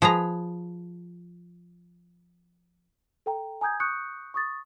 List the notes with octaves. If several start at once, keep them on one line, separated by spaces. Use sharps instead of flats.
F3 G#4 B4 A#5
A4 G5 A#5
G#5 A#5 D#6 G6 G#6
C#6 D#6 F#6 G6 C#7
C#6 D#6 A6